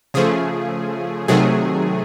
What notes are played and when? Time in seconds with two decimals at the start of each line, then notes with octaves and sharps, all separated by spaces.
0.14 C#3 F3 A3 G#4
1.28 C3 D#3 F#3 A3 G#4